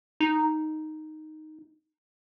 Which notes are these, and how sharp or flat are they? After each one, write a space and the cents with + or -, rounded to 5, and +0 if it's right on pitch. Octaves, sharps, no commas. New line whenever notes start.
D#4 +0